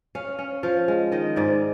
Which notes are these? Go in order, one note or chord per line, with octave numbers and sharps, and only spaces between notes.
C#4 F5
C#4
F3 F5
G#3
D#3 D#5
G#2 D5